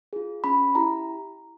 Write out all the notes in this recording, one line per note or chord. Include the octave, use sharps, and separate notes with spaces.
F4 G#4
C#4 B5
E4 G4 A#5